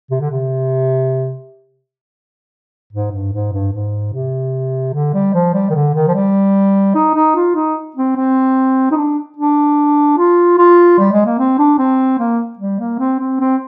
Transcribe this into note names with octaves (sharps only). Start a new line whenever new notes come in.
C3
D3
C3
G#2
G2
G#2
G2
G#2
C3
D3
G3
F3
G3
D#3
D3
D#3
F3
G3
D#4
D#4
F4
D#4
C4
C4
D#4
D4
D4
F4
F4
G3
G#3
A#3
C4
D4
C4
A#3
G3
A#3
C4
C4
C4